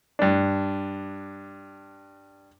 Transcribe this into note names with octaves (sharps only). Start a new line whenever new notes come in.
G2 D4